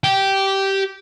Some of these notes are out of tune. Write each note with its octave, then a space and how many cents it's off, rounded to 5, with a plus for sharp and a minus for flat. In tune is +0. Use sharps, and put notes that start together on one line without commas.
G4 -10